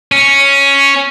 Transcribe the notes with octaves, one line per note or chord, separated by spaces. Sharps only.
C#4